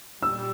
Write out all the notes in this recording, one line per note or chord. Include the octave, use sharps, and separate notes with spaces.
A#2 G3 E6